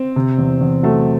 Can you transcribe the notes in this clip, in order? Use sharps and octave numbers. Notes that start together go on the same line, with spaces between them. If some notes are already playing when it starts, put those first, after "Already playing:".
Already playing: C4
C3
E2
E2
F#3 A3